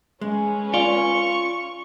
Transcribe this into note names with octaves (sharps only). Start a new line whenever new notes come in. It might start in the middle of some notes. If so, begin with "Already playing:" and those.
G#3 C#4 B4
F4 D5 C#6